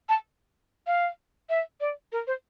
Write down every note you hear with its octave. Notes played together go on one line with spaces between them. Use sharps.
A5
F5
E5
D5
A#4
C5